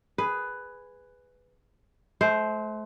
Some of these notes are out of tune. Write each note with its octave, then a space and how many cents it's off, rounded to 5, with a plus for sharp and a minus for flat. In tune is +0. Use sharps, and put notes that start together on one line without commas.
G#4 +0 B4 +10
A3 -35 C5 +0